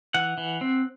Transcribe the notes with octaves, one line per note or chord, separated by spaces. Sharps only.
E3 F#5
E3
C4